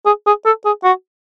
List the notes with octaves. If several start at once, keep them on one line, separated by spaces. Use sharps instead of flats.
G#4
G#4
A4
G#4
F#4